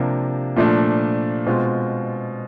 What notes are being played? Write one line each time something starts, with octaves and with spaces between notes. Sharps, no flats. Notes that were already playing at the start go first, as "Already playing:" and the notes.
Already playing: C3 F3 A#3 D4
A#2 F3 A3 D4
B2 G#3 C4 F4